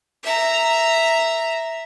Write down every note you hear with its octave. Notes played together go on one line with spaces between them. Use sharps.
E5 A#5